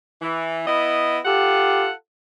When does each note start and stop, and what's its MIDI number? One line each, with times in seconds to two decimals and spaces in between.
0.21 0.62 52
0.67 1.19 59
0.67 1.19 64
0.67 1.19 75
1.25 1.92 65
1.25 1.88 67
1.25 1.92 69
1.25 1.92 78